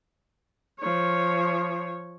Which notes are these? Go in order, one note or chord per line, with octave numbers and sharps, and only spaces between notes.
F3 C#5